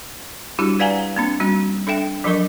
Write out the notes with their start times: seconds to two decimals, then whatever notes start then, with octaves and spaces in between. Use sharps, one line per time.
0.59 G3 D4 E4 F#4 G4
0.79 B4 D5 F5 F#5 G#5 A#5
1.16 A#3 C4 D4
1.40 G3 C#4 F#4
1.87 D4 A4 E5 G5
2.24 F3 F#3 D4 A#4 C#6